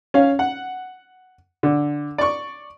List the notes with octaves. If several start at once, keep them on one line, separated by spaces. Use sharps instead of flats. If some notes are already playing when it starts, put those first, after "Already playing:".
C#4 F5
F#5
D3
D5 C#6